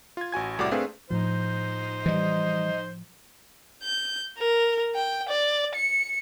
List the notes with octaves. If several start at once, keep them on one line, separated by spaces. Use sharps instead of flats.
F4 G#6
A1 F#4 G#5 G#6
C2 A2 C3 F#4 D5 D6
A3 C4 D4 G#4 B4 F5
A2 F3 D#4 C5
E3 G3 D#5
G6
A#4
G5
D5
C#7